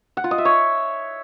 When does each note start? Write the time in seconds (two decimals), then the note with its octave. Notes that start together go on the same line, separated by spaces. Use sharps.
0.17 F#5
0.24 F4
0.31 D#5
0.38 E5
0.45 C#5